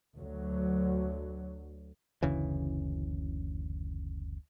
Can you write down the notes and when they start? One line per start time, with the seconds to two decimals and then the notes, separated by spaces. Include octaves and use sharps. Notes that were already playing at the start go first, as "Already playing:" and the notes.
0.17 D2 F#3
2.23 F#1 D2 C#3 E3